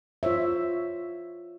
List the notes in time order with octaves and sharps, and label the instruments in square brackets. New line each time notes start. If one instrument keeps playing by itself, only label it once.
[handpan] F4 C5 C#5 E5